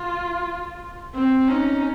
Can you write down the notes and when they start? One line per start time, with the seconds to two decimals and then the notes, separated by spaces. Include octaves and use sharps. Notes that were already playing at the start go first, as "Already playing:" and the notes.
Already playing: F4
1.14 C4
1.48 C#4 D#4